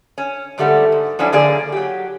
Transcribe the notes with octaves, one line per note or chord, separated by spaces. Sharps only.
C#4
G#2 D3 G3 A3 F#4
G#2
F3 F#3 C#4 D4 E4
F#2 D3 A#3 G#4 D5
F#3 G4